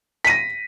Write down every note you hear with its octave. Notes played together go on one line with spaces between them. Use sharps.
A#6 B6 D#7